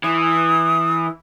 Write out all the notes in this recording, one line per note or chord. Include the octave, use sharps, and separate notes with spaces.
E3 D#6